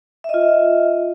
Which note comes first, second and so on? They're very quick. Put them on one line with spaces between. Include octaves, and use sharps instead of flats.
E5 D#5 F4